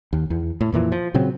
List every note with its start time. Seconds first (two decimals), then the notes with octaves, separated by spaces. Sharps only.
0.13 D#2
0.30 E2
0.61 A2
0.72 F2 A#2 E3 F3
0.92 F3
1.14 A#2 C#3 F#3 C4